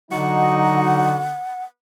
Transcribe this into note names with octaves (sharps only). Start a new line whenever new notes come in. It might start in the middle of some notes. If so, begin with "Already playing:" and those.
D3 F#3 D#4 F#4 F#5